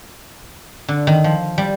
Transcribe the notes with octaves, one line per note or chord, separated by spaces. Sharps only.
D3
D#3
F3
G3